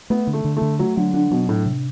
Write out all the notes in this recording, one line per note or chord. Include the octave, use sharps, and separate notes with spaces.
A3 B3
D3
A3
D3
A3
D3
F#3 A3
D3 F#3
D3 D4
B2 F#3
A2 D4
C3